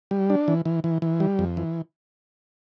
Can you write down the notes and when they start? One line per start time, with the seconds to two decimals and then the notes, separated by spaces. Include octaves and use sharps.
0.11 G3
0.30 D4
0.48 E3
0.65 E3
0.84 E3
1.02 E3
1.20 G3
1.39 F2
1.57 E3